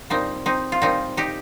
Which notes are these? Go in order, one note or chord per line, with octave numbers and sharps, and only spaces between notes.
A#2 G3 C4 D#4
C4 D#4
F4
A#2 G3 C4 D#4
D#4 G4